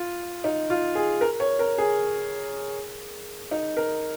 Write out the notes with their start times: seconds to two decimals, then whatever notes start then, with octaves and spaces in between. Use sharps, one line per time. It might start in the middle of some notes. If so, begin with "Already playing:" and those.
Already playing: F4
0.44 D#4
0.70 F4
0.95 G#4
1.21 A#4
1.40 C#5
1.59 A#4
1.78 G#4
3.51 D#4
3.77 A#4